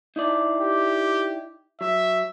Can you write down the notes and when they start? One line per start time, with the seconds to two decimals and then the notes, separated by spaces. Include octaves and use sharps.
0.16 D#4 E4 D5
0.59 G4
1.81 F#3 E5